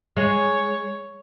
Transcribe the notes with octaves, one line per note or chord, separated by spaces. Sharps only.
G#3 C#5